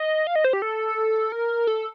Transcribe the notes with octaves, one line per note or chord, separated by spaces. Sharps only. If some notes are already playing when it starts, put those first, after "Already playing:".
Already playing: D#5
F5
D#5
C5
G4
A4
A#4
A4